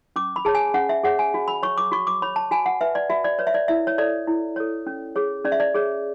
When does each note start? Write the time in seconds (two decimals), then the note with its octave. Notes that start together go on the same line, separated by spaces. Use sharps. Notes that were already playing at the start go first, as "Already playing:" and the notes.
0.16 C#4 D6
0.36 B5
0.45 G#4 C#5 A5
0.55 G#5
0.74 C#4 F#5
0.89 E5
1.04 G#4 C#5 F#5
1.19 G#5
1.34 F#4
1.48 B5
1.63 C#5 C#6
1.78 D6
1.92 F#4 C#6
2.07 D6
2.22 C#5 B5
2.36 A5
2.51 F#4 G#5
2.66 F#5
2.81 B4 E5
2.95 D5
3.10 F#4 E5
3.24 D5
3.39 B4 C#5
3.47 E5
3.54 D5
3.68 E4 E5
3.87 C#5
3.98 A4 C#5 D5
4.27 E4
4.56 A4 C#5
4.86 C#4
5.16 G#4 C#5
5.45 C#4 D5
5.52 E5
5.60 D5
5.74 G#4 C#5